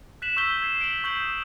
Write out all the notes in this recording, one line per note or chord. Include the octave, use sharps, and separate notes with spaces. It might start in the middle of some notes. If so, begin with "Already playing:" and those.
F#6 B6 E7 F#7
C#6 E6 F#6 G6 B6 G7
G#6 C7
D7 F#7
C#6 G6 F#7
D#6